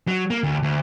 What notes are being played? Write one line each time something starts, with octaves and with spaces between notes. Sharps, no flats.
F#3
A#3
D2
D2